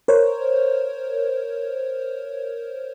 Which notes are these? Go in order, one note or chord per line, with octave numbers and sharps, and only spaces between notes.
A#4 C5 C#5